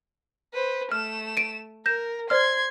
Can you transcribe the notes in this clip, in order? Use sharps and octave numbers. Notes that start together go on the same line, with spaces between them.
B4 C5
A3 F6 E7
D7 D#7
A#4 G6 A#6 E7
C5 D5 C6 F6 G#6